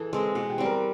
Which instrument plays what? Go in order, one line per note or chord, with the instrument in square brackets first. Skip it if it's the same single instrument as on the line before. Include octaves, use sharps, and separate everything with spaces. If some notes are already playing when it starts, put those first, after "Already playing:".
Already playing: [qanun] E3 [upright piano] G#4 A4
[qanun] G#3 C4 [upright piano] A4
[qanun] B2 [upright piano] F#4
[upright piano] G4
[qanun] G3 C4
[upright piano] A#4